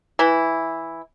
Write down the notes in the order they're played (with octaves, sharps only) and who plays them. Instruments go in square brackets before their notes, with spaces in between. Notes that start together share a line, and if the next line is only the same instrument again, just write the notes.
[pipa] E3 E4